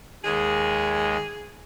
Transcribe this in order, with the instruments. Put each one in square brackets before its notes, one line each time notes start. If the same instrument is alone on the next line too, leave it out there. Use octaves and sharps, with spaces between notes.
[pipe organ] D#2 G#3 [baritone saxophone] G#4